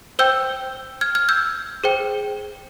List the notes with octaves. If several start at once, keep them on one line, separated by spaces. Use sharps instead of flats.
C5 G5 E6 G6
F6 G#6
F6 G#6
E6 G6
G#4 C5 G5